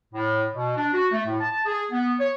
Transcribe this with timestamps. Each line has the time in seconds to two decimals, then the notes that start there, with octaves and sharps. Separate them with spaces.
0.14 A2
0.55 B2
0.76 D4
0.93 F#4
1.12 A3
1.26 A2
1.40 A5
1.66 G#4
1.92 B3
2.20 C#5